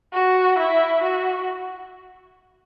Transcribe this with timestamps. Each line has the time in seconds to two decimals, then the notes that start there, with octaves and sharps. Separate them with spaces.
0.13 F#4
0.58 E4
1.02 F#4